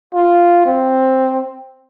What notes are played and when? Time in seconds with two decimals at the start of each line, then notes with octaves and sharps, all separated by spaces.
0.14 F4
0.66 C4